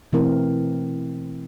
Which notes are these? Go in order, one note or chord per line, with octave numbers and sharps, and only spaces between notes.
B2 E3 A3 C4 E4 A#4